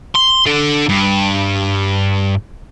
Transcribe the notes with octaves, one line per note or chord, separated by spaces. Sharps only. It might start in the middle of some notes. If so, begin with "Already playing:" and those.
C6
D3 A4
G2